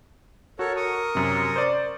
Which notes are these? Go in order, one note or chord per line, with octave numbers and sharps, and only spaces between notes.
F#4 A4 A#4 C#5
A#4 C#6 D#6
F#2 C3
C5 D5